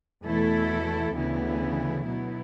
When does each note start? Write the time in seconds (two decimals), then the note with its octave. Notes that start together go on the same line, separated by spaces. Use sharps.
0.24 E2 B2 A3 E4 A4
1.14 D2 C#3 E3 B3 E4
2.06 B2 F#3 B3 E4